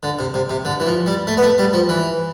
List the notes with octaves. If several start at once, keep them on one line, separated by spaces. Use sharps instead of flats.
D3
C3
C3
C3
D3
E3
F3
G3
A3
B3
A3
G3
F3
E3